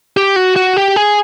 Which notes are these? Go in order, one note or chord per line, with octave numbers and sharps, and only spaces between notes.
G4
F#4
F#4
G4
G#4